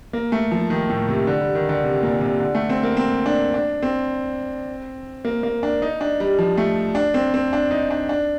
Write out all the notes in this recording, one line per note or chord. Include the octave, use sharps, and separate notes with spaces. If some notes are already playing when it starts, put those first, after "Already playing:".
A#3
A3
F3
D#3
A2
C3
D3
G3
D#3
D3
C3
A#2
C3
D3
A3
C4
A#3
C4
D4
D4
C4
A#3
A#3
D4
D#4
D4
G3
F3
A3
D4
C4
C4
D4
D#4
D4
D4